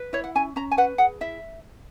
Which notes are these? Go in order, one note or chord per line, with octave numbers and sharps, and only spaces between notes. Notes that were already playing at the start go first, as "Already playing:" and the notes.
Already playing: B4
E4 C#5
F#5
C#4 G#5
C#4 A#5
G#5
B4 F#5
G#4 F#5
E4 E5